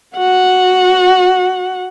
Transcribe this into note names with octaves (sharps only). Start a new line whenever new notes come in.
F#4 F#5